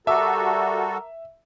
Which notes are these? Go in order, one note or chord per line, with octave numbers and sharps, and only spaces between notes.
G3 F#4 A4 A#4 E5 A5 D6 E6